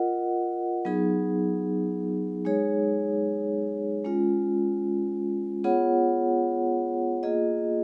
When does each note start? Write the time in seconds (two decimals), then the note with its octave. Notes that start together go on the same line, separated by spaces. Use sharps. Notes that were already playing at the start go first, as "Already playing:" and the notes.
Already playing: F4 A#4 D#5 F#5
0.85 F#3 B3 D#4 G#4
2.45 G#3 D#4 G#4 C#5
4.04 G#3 C#4 F4
5.64 B3 F4 G#4 C#5 F#5
7.23 A#3 F4 G#4 D#5